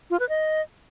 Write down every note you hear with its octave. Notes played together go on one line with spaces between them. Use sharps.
F4
B4
D#5